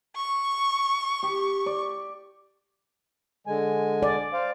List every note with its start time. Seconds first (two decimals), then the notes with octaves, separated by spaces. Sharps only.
0.16 C#6
1.23 G4
1.66 D5
3.47 D3 G#3 G#5
4.03 D5
4.33 C5 F5